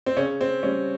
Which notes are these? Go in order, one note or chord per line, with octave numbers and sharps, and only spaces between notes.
C4
C#3 C#4
C4
G3 C#4